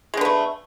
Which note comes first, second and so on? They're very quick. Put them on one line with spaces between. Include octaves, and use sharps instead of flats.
G#3 D3 B3 A3